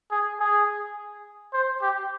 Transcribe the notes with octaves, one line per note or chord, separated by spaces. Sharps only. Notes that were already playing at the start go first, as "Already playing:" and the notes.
G#4
G#4
C5
G4